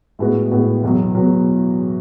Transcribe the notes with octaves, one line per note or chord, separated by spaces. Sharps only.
A2 G#3 B3 F#4
A2 G#3 B3 F#4
E2 B2 F#3
B2 F#3